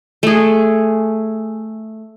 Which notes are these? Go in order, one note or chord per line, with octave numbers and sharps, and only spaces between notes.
A3 G#4